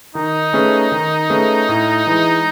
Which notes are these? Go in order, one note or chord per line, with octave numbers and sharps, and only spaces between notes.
D#3 D#4
A3 C#4 G#4 B4
D#3
A3 C#4 G#4 B4
A2
E3 G#3